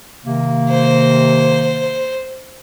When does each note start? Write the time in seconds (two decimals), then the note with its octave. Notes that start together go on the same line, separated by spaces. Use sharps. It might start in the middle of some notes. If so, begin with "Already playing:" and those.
0.25 C3 D#3 A#3
0.70 C5